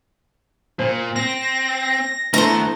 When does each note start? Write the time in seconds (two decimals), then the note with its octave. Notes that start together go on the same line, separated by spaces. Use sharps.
0.79 A#2 C5
1.16 C4 A#6
2.34 E3 A3 B3 D4 E4 C5 A#5